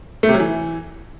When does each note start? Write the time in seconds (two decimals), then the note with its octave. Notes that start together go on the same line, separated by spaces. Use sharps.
0.23 A3
0.29 C3
0.34 F#3
0.40 E3